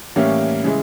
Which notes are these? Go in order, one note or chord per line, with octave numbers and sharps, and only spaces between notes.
A2 E3 G3 A#3 C#4
C#3 E3 G#3